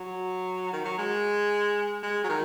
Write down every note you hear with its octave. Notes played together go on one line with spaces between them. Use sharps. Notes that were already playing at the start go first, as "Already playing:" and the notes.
Already playing: F#3
D#3
F#3
G#3
G#3
F#3
D#3